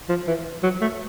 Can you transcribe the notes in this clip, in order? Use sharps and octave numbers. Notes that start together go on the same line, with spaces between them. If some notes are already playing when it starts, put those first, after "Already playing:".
F3
E3
F#3
A3